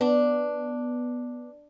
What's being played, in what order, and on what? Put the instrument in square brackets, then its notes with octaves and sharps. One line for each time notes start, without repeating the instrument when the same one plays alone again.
[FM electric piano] B3 [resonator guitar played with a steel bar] D4